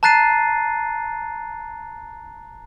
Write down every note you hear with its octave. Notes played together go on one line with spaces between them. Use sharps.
A5 A#5 F#6 A6 C7 D#7